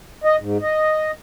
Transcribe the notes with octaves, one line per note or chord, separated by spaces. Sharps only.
D#5
G#2
D#5